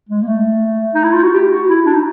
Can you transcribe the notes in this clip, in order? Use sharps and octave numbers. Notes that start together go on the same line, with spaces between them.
G#3
A#3
A3
D#4
E4
F4
F#4
G4
F#4
E4
D4
D#4